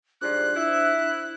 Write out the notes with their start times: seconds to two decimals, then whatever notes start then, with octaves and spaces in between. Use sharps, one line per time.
0.21 G#2 F3 G3 D4 C5 F#6
0.55 E4